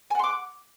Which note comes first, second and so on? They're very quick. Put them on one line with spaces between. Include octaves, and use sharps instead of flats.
G#5 F#5 C6 D6